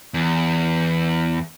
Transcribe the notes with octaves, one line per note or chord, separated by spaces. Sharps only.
E2